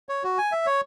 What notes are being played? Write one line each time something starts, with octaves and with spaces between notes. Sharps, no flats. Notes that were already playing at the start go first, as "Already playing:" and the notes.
C#5
F#4
G#5
E5
C#5